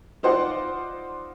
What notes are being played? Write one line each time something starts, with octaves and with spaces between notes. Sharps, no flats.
D#4 F4 C5 D5 F#5